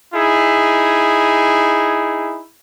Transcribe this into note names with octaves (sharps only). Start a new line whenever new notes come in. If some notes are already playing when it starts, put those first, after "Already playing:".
D#4 E4 G#4